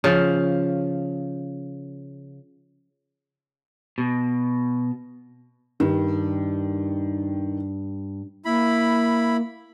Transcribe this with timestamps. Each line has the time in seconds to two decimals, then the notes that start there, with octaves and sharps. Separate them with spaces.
0.04 C#3 F3
3.98 B2
5.80 G2 D#3
8.45 A#3 E4 B5